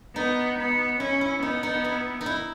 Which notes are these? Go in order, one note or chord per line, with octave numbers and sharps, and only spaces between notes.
B3 D#4
B3
C#4 E4
E4
B3 D#4
D#4
E4
D#4
E4